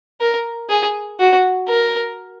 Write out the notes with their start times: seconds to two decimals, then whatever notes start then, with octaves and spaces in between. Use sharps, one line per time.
0.21 A#4
0.70 G#4
1.20 F#4
1.69 A#4